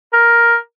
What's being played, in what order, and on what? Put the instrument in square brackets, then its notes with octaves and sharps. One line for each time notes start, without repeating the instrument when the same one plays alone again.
[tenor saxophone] A#4